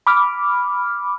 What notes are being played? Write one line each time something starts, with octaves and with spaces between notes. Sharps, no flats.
B5 D6 F6